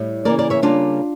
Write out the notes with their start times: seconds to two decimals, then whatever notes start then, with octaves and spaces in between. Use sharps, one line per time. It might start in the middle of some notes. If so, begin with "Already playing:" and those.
Already playing: A2 G3
0.25 C#3 E3 A#3 A#4 D5
0.39 A#4 D5
0.50 C#5 E5
0.62 C#3 G3 A#3 D4 F4